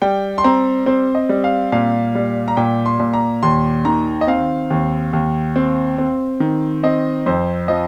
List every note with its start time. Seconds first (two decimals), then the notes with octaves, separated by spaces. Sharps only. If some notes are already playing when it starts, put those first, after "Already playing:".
0.02 G3 G5
0.38 C6
0.44 C4 A#5
0.86 C4 C5
1.15 D#5
1.29 G3
1.44 F5
1.72 A#2 F5
2.15 G3
2.48 A#5
2.57 A#2 G5
2.86 C6
3.00 A#2
3.13 A#5
3.43 D#2 C6
3.85 D#3 A#5
4.21 D#5
4.27 C4 F5
4.70 D#2
5.13 D#2
5.56 C4
5.98 C4
6.40 D#3
6.83 C4 D#5
7.26 F2 C5
7.68 F3 D#5